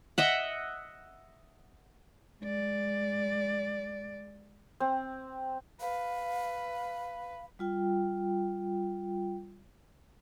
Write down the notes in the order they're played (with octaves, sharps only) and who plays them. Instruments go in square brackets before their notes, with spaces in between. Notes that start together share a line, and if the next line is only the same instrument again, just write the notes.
[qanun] D#5 E5 F#5
[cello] G#3 D5
[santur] C4
[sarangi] B4 [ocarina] F5
[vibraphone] G3 F4 G5